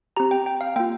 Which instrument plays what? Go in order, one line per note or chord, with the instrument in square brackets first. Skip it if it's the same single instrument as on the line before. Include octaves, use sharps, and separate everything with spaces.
[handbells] C4 G4 A#5
G5
G5
F5
A#3 F4 G5